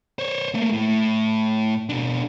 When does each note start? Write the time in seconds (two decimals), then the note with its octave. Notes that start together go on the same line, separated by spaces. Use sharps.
0.19 C5 C#5
0.54 A3 A#3
0.73 A2
1.89 B2 D4